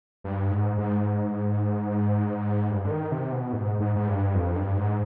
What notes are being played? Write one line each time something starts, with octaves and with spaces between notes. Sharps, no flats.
G2
G#2
G#2
G2
D3
D#3
C3
B2
G#2
G#2
G#2
G2
F2
G2
G#2